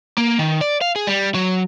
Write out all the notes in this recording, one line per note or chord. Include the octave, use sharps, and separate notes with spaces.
A#3
D#3
D5
F5
G#4
G3
F#3